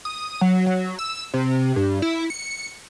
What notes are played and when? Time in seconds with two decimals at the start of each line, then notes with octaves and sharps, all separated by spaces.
0.05 D#6
0.41 F#3
0.66 F#3
0.99 E6
1.34 C3
1.76 G2
2.02 E4
2.30 C#7